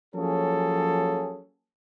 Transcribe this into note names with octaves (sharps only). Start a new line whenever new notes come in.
F3 F#3 A#3 C#4 G#4 A4